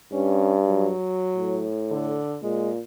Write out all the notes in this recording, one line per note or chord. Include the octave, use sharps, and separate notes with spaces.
G2 C#4
F#3
A2
D3
A#2 G#3